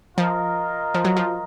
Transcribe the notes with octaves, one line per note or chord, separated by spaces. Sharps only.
F3 F4 A#4 D#5
F3
F#3
F3